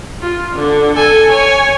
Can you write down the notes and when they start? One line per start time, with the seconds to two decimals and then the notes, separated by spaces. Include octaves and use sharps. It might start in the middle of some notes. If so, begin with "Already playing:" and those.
0.21 F4
0.56 D3
0.96 A4 G#5
1.31 C#5 G#5